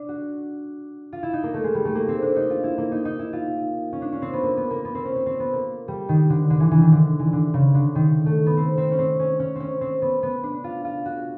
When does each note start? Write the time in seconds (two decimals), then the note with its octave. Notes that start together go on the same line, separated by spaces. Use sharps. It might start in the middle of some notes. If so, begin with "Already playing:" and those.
Already playing: D4
0.09 F#4
1.13 F4
1.23 E4
1.33 D#4
1.43 A#3
1.54 A3
1.64 G#3
1.74 G3
1.85 A3
1.95 A#3
2.08 C4
2.22 D4
2.36 D#4
2.50 F4
2.64 E4
2.78 A#3
2.92 D#4
3.05 D#4
3.19 E4
3.33 F4
3.93 C#4
4.02 D4
4.12 C#4
4.22 C4
4.33 B3
4.43 A#3
4.57 B3
4.71 A#3
4.85 B3
4.95 C4
5.05 C#4
5.16 C4
5.26 C4
5.40 B3
5.53 A#3
5.88 G3
6.09 D#3
6.30 D3
6.50 D3
6.60 E3
6.71 E3
6.81 D#3
6.92 D3
7.19 E3
7.33 D3
7.54 C#3
7.74 D3
7.95 D#3
8.26 A3
8.46 B3
8.57 C4
8.78 C4
8.92 C#4
8.99 C4
9.19 C#4
9.40 C#4
9.56 C4 C#4
9.81 C4
10.02 B3
10.23 B3
10.43 D4
10.64 F4
10.85 F4
11.06 F#4